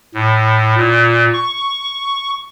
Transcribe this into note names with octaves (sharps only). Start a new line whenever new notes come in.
A2
A#2
C#6